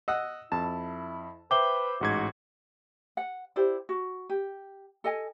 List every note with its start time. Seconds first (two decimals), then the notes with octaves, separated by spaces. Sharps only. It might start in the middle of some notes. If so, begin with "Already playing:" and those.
0.08 D#5 F#5 E6
0.52 F2 E4 A5
1.51 B4 C5 E5 G5 D6 G7
2.01 A1 G#2 F#4 G#6
3.17 F#5
3.56 E4 G4 C5 D5
3.89 F#4
4.29 G4
5.04 A4 D#5 G#5